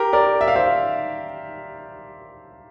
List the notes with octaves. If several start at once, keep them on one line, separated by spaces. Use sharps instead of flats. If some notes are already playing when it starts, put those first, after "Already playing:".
Already playing: G4 A#4
A#4 D5
E5
F5
C5 E5